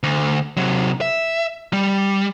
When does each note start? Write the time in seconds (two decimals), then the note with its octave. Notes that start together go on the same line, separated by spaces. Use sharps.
0.03 D2
0.57 C3 F#3
1.01 E5
1.73 G3